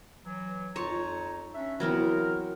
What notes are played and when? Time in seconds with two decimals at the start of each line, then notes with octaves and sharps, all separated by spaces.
0.24 E3 F#3
0.76 F2 D#4 F4 C#5 A5 A#5 C6
1.54 C#4 D4 E5
1.80 E3 F#3 B3 C4 E4 A#4